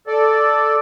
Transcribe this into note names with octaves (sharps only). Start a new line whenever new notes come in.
A4 D5